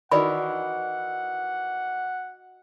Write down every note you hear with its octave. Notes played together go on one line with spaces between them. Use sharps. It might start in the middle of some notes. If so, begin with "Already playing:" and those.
D#3 E3 F#4 D5 D#5 F#5 B5